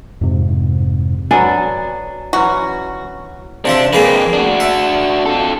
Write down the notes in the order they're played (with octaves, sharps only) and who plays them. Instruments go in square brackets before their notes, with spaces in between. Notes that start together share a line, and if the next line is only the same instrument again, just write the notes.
[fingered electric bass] F2 G#2 C3
[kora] F#3 B3 A4 [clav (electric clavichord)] D4 [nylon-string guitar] G#5
[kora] E3 F#3 C#4 [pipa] F#4
[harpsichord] C3 F3 E5 [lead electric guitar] D4
[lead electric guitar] F2 [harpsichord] A#3 G#4 B4
[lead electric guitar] D4 F#4
[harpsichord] E5
[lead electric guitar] F4 A4